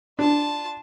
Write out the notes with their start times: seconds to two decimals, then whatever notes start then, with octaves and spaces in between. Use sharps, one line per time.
0.19 D4 F4 A5